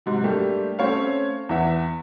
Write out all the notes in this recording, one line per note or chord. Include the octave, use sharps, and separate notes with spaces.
G#2 C3 F#3
G3 A3 A#3 D4 G4
A3 C4 C#4 C#5 F5
E2 E3 E5 F#5